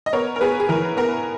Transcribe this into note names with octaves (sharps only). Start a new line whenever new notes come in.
D#5
B3 A#4 C#5
A#4
B3 G#4 B4
G#4
E3 A#4
B3 A#4